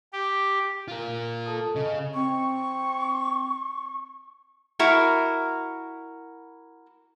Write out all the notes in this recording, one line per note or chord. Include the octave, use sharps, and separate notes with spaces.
G4
F4 A#4
A4 A5 D#6
C#3 D#5
C4 C#6
E4 F#4 A#4